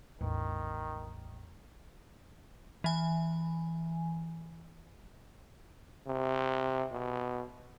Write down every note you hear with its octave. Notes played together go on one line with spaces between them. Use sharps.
A1 E2 A2 D#3
E3 G#5
C3
B2